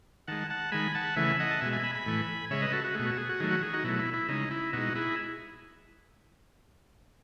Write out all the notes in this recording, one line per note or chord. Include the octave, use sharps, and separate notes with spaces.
D#3 G#3 F#5 A5
F#5 A5
D#3 G#3 G#5 B5
F#5 A5
C#3 E3 A3 E5 G#5
D#5 F#5
A5
B2 G#3 E5 G#5
E5 G#5
G#5 B5
G#5 B5
A2 E3 A3
C#3 G#3 C#5 E5
B4 D#5
F#4 A4
F#4
B2 A3 G#4
F#4
G#4
F#4
D#3 F#3 A3 G#4
F#4
G#4
D#4 F#4
B2 F#3 A3 E4
E4
E4
C#3 G#3 D#4
E4
B2 G#3 D#4 F#4
E4 G#4